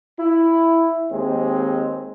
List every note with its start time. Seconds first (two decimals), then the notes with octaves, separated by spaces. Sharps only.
0.19 E4
1.12 D#2 G#3 C4